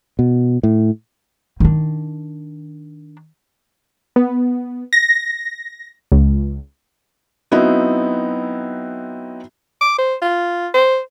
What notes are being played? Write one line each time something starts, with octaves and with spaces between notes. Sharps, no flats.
B2
A2
D#3 D4
B3
A#6
C#2
F#3 B3 C4 D#4 E4
D6
C5
F4
C5